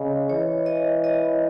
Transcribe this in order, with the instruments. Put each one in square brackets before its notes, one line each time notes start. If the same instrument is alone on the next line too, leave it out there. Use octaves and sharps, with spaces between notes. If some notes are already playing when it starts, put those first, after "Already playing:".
Already playing: [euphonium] C#3 [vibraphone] D#5
[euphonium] E3 [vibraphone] C#5
[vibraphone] D#5
D#5